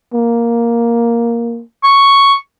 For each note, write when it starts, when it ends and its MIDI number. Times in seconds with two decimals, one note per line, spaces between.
0.14 1.61 58
1.84 2.36 85